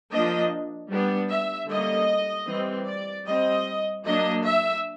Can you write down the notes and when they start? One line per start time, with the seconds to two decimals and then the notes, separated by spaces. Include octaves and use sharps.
0.11 F3 A#3 D4 D#5
0.89 G3 B3 D4
1.29 E5
1.68 D3 G3 A#3 C#4 D#5
2.46 E3 G3 C4
2.87 D5
3.26 G3 C4 D#5
4.05 F#3 A#3 D4 D#5
4.45 E5